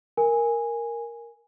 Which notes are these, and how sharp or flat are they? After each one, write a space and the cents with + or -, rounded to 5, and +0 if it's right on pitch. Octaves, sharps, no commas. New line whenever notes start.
A#4 +0 G#5 -10